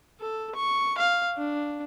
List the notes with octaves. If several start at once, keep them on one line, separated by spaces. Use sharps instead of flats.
A4
C#6
F5
D4